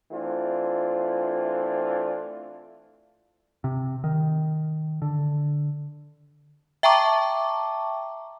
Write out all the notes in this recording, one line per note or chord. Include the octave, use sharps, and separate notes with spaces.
E3 A3 C4 D4 F4
C3
D#3
D3
E5 G5 A5 A#5 C#6 D6